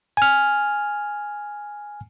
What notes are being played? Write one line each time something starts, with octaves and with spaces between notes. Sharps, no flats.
G#5 F6